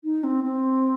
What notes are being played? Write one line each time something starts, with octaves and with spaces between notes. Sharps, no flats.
D#4
C4
C4